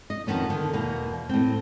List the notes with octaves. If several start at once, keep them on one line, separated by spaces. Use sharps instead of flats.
D#5
F2 D#3 B3 C#4
D3 D#3
E2 B2 A#3
A2 C4